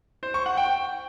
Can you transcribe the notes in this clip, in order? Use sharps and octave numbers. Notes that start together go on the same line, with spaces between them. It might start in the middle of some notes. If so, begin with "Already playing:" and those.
C5
C#6
F#5
G5